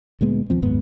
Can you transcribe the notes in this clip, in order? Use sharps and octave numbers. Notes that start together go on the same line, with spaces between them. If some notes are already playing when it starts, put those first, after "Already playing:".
D2 A#2 G#3 B3
D#2 F3 C4
F#1 D#2 G#2 B3